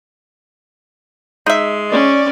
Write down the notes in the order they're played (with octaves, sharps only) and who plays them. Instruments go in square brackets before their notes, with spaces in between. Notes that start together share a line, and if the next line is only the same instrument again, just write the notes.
[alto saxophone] G#3 [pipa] D#4 E5
[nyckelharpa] C#4 [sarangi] D5